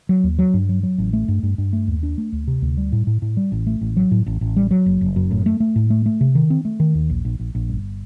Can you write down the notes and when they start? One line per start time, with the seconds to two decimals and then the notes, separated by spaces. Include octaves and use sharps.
0.09 F#3
0.24 D#2
0.39 F#3
0.54 G2
0.69 F#3
0.83 F#3
0.98 A1
1.13 A3
1.28 G2
1.43 G2
1.58 G2
1.73 A3
1.88 D#2
2.03 D4
2.18 A3
2.32 D2
2.47 C3
2.62 D2
2.77 G3
2.92 A2
3.07 A2
3.22 A2
3.37 G3
3.52 A1
3.67 A3
3.81 A1
3.97 F#3
4.11 A2
4.26 A1
4.41 A1
4.56 G3
4.71 F#3
4.86 F#1
5.01 F#1
5.16 F#2
5.31 A2
5.46 A3
5.60 A3
5.76 A2
5.90 A3
6.06 A3
6.21 C3
6.35 D#3
6.50 C4
6.65 A3
6.80 D#3
6.95 D#2
7.10 A#1
7.25 A#1
7.40 A#1
7.55 A#1
7.69 G1